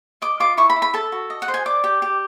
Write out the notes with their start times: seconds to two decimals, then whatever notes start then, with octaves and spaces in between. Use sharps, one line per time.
0.22 D#5 D6
0.40 F4 D6
0.57 E4 C#6
0.70 B5
0.76 E4
0.82 B5
0.94 A4 A5
1.12 F#4
1.30 D#5
1.42 F#5
1.48 C5
1.54 G#5
1.66 D5 D6
1.84 G4
2.02 G4